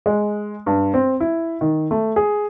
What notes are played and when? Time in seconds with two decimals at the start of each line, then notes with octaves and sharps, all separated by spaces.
0.06 G#3
0.66 G2
0.94 C4
1.20 E4
1.61 D#3
1.91 A3
2.16 G#4